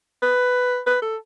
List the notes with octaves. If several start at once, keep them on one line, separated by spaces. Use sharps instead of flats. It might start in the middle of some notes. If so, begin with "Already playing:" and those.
B4
B4
A4